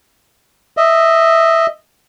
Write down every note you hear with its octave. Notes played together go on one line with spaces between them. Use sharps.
D#5 E5